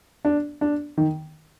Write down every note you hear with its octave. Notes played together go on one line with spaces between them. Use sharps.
D4
D4
D#3